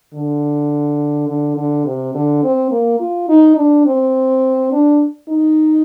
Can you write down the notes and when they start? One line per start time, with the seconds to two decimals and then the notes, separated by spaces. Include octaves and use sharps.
0.14 D3
1.28 D3
1.57 D3
1.85 C3
2.14 D3
2.43 C4
2.71 A#3
3.00 F4
3.29 D#4
3.57 D4
3.86 C4
4.72 D4
5.29 D#4